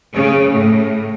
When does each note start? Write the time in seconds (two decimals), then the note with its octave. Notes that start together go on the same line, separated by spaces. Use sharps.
0.13 C#3
0.50 A2